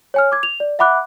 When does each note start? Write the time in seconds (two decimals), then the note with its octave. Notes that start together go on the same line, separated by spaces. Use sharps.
0.14 C#5 G#5 F6
0.32 D6 G#6
0.43 F7
0.60 D5
0.79 E5 F#5 B5 D6 F#6